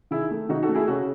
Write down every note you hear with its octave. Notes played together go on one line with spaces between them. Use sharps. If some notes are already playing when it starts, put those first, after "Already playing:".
D#3 E4 G#4
A3
D#3 D#4 F#4
F#4 A4
A3
E4 G#4
C#3 F#4 A4